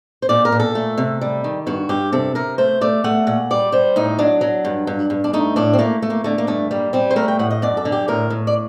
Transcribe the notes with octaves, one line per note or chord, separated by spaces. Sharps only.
C5
A#2 D5
A#4
A#2
A4
A3
C3
G3
D#3
G2 F#4
G2 G4
C3 A4
C3 A#4
A3 C5
A3 D5
A3 F#5
A#2 F#5
G3 D5
G3 C5
A2 D#4
F#3 D4
F#3
G2
G2
G2
D4
A3 D#4
A2 D4
C4
A3 A#3
A3
A#3
D3 A3
A#3
G2 A3
G3 A#3
G3 C4
C5
A3 A#4
G5
A2 F#5
D#5
F#2 D5
A4
D3
G4
A2 A#4
A2
D5